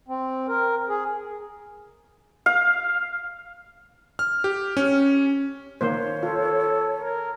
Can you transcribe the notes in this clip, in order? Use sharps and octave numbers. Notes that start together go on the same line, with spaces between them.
C4
A#4
G#4
F5
F6
G4
C#4
D#3 A#3 C5 C#5
F4 A4
A#4